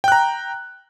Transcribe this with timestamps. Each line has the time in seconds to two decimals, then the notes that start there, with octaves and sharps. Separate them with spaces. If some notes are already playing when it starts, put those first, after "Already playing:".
0.04 G5
0.08 F#6
0.12 A#5